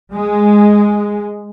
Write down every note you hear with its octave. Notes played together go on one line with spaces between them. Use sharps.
G#3